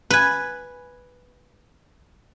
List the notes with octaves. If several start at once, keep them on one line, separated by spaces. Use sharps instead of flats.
B4 G#5